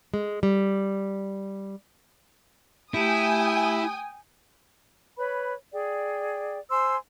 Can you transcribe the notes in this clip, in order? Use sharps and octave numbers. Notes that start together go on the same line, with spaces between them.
G#3
G3
A3 E4 G4 G5 G#5 D#6
B4 C#5 B5
G#4 D5 G5
C5 G#5 C6 E6